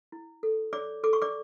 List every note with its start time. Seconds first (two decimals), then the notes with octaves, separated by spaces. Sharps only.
0.12 E4
0.43 A4
0.73 C#5 D5 D6
1.04 A4 D6
1.13 C#6
1.22 D5 D6